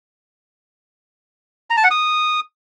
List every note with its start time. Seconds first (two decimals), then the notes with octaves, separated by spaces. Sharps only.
1.70 A#5
1.77 A5
1.84 F#5
1.91 D#6